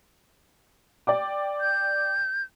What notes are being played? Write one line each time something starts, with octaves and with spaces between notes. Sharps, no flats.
D5 G5 D6
G6